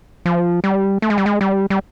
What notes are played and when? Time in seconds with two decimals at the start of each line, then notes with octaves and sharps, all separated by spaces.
0.26 F3
0.64 G3
1.02 A3
1.10 G#3
1.18 G3
1.26 G#3
1.41 G3
1.70 G3